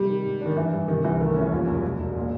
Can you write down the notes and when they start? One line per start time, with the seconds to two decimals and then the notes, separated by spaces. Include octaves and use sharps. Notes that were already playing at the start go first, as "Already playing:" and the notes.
Already playing: C3 G3
0.09 D#3
0.25 G#2
0.41 D4
0.46 D#3
0.56 G2 E3
0.72 G2
0.88 C3 D#3
1.04 C2 E3
1.20 D#3 A3
1.31 D#3
1.36 E3 C#4
1.52 D#2 F3
1.68 E1
1.73 G3
1.84 E1 F#3
2.00 E1
2.15 A#2